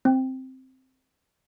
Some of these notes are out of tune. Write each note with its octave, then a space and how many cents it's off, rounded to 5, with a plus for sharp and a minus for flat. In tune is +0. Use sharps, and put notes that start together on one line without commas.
C4 +0 G5 +0